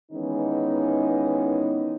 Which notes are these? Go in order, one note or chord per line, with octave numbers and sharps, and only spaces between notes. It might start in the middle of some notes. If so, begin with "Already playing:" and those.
D#3 E3 G#3 B3 C#4 D#4